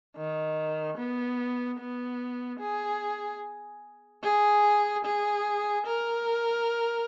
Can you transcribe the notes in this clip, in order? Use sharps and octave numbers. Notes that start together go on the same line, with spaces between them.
D#3
B3
B3
G#4
G#4
G#4
A#4